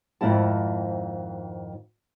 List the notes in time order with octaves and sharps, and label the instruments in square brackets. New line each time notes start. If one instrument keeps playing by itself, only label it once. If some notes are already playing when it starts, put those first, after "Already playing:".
[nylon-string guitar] F2 G#2 D#3 C4 E4 A5